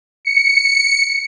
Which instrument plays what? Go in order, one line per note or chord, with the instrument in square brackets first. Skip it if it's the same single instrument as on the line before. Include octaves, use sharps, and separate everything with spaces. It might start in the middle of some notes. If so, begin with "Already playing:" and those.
[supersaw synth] C#7